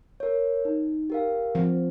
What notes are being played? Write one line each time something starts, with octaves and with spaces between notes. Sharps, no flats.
A#4 C#5
D#4
G4 A#4 F5
F3 C4